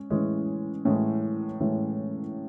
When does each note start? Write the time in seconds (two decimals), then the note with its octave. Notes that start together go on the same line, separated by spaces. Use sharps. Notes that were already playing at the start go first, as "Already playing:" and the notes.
Already playing: G#3 C#4
0.10 A2 E3 G#3 C#4
0.85 A2 E3 G#3 C#4
1.60 A2 E3 G#3 C#4